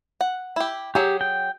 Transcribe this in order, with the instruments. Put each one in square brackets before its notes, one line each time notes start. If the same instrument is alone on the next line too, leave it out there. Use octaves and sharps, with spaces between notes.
[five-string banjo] F#5
E4 G4
[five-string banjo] F#3 G#4 [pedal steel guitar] G4
[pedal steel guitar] G5